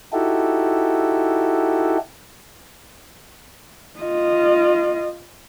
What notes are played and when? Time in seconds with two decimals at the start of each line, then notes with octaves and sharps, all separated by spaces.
0.13 D#4 E4 F#4 G4 A4
4.00 F4 D#5